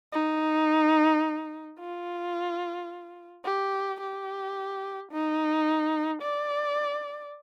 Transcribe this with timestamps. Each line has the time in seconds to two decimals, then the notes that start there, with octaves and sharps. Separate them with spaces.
0.13 D#4
1.79 F4
3.45 G4
4.00 G4
5.11 D#4
6.22 D5